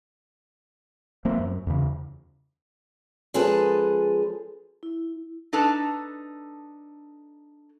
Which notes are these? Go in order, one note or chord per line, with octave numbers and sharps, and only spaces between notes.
F3 A3 A#3 C4
F#2
E2 C#3
F3 G#3 C#4 G#4 A4 B4
E4
D4 D#4 A4 B4 A5